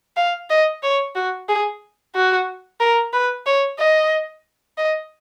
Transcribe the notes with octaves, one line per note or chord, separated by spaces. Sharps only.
F5
D#5
C#5
F#4
G#4
F#4
A#4
B4
C#5
D#5
D#5